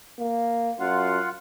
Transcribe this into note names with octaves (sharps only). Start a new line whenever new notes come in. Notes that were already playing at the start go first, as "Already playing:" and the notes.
A#3
F#2 F4 F5 F#5